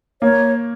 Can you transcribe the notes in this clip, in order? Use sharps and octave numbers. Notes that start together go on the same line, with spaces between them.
A#3 C#5